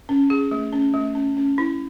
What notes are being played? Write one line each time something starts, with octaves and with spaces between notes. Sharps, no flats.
C#4
G#4
A3
C#4
A3
C#4
C#4
E4